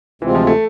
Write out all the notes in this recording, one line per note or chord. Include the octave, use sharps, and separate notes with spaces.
D2 C3 E3 G#3 C4 F4
F3
A3